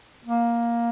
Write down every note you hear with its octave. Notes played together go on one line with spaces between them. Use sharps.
A#3